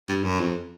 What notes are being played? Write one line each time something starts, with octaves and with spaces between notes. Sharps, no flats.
G2
F#2
F2